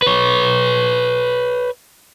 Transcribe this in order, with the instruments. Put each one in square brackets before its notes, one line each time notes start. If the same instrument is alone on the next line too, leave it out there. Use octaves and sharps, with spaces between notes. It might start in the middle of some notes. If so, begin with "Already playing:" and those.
[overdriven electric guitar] B4 C#5